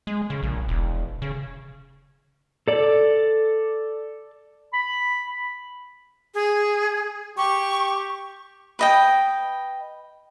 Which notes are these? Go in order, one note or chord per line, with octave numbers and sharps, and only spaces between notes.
G#3
C#3
A#1
E1
C#3
A4 D5
B5
G#4
G4 C#6
B4 D#5 G5